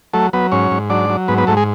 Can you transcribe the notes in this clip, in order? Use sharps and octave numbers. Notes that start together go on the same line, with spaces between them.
F#3 A3 A4
F#3 B3 B4
G#2 C#4 C#5
G#2
F#3 D4 D5
F#3
G#2 B3 B4
B3 B4
G#2 A3 A4
G#3 G#4